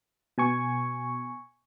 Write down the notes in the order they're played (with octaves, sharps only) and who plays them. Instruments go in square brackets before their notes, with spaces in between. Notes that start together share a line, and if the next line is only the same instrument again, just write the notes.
[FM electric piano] B2 G#5 C#6